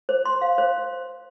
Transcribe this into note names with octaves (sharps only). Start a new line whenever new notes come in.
C5
C6
F5
C5